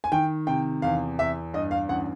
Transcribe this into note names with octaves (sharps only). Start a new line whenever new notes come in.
G#5
D#3 G5
C3 G5
E2 F5
E2 E5
G2 D#5
F5
A1 F#5